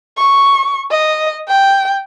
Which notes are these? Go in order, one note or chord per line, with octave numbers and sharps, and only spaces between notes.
C#6
D#5
G5